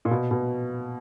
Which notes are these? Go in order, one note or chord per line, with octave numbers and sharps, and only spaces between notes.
A#2
B2
B2